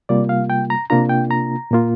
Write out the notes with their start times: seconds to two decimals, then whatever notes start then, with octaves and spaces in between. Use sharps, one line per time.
0.09 C3 G3 A#3 F4 D5
0.29 F5
0.50 G5
0.70 A#5
0.90 C3 A#3 D4 F4 A#5
1.09 G5
1.31 A#5
1.71 A#2 A#3 F4